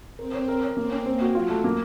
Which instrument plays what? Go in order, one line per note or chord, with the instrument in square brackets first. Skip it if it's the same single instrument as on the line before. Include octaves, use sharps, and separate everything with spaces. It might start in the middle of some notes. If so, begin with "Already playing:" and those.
[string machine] C4 [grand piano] A#4
[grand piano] C#5
A#4
C#5
[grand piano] A#3 [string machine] C4
[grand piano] C#4
[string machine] A#3 [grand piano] C4
[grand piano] F#4
[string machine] F#3 [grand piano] F4
[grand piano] A3
A#3